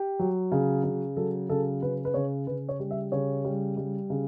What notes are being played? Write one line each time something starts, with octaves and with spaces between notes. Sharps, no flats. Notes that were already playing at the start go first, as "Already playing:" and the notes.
Already playing: G4
F#3
C#3
C#3
F#3 A4
C#3 A4
C#3 B4
B4
C#3 C#5
C#3 B4
C#5
G3
E5
C#3 C#5
G3
G3
C#3